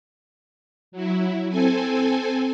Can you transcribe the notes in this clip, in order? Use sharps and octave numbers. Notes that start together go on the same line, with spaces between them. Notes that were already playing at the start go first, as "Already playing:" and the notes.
F#3 E4
C4 A4 G#5